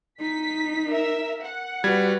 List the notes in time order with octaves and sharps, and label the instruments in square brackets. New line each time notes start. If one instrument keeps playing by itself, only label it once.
[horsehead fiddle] D#4 [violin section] B6
[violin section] A#4 E5
F#5
[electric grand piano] G3 G#6 [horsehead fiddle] F#4 B4